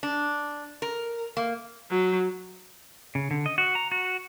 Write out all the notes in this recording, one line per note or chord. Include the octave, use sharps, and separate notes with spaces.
D4
A#4
A#3
F#3
C#3
D3
D#5
F#4
A#5
F#4